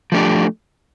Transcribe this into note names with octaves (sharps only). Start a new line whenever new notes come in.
F3 A3 D4 G4